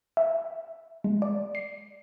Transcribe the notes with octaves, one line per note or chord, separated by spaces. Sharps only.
E5
G#3
D5
C7